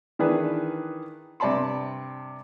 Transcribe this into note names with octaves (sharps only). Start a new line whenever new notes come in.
D#3 E3 D4 G#4 B4
G2 C3 D5 A5 B5 C6